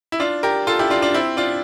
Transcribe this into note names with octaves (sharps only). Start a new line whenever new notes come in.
E4
D4 F4
G4 A#4
F4 A4
E4 G4
D4 F4
D4 F4
C4 E4
D4 F4